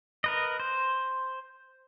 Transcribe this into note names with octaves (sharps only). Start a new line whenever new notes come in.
A#4 B4 D#5
C5